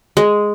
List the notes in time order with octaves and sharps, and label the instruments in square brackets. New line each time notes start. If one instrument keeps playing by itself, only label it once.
[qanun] G#3